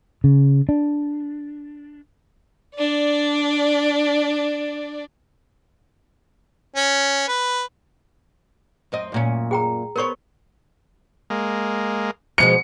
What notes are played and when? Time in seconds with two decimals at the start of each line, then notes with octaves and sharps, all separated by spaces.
0.24 C#3
0.69 D4
2.76 D4 D5
6.76 C#4
7.28 B4
8.92 F#2 C4 D#5
9.12 F#2 A#2 C#4
9.51 G#4 G5 A#5
9.96 B3 A#4 C5 C#5 C#6
11.30 G#3 A#3
12.38 B2 F3 G#3 C#7